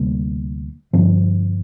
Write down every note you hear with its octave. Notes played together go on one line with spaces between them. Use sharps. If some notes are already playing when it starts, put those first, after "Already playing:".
Already playing: D2 C3 G3 A#3
G2 D3 F3 C4